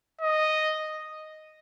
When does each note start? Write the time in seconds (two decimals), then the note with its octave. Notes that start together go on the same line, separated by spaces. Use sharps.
0.21 D#5